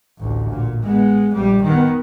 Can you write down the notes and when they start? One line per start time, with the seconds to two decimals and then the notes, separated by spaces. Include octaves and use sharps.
0.18 A1 D2
0.49 A#2
0.83 G#3 B3
1.34 A#1 G3
1.63 D#3 B3